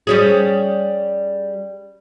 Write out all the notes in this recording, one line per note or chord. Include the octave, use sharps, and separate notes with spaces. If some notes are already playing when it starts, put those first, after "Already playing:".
G3 C#4 G#4